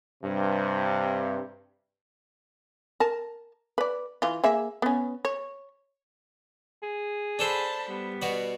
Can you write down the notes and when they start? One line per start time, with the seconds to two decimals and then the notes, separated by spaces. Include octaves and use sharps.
0.23 G2 C3
3.00 A#4 A5
3.78 B4 D5
4.22 E3 F4
4.44 A#3 G#4 E5
4.82 B3 C#4
5.25 C#5
6.83 G#4
7.39 D4 A4 C5 A5 B5
7.89 G3 B3
8.22 B2 F#4 D5